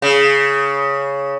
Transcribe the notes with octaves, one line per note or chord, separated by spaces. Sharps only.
C#3